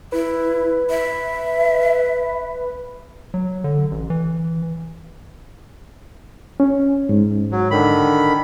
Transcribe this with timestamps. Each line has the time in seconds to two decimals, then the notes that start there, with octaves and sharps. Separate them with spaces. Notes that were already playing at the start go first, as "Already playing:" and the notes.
0.12 E4 B4
0.90 E5
3.34 F#3
3.64 D3
3.91 A1
4.10 E3
6.60 C#4
7.09 G#2
7.52 F#3
7.71 D3 D#3 B5